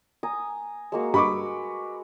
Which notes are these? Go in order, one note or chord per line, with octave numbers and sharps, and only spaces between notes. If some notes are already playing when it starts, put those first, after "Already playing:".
G#5 A#5 D#6
G#3 A#3 F#4
G2 B4 D#5 B5 C#6 D6 E6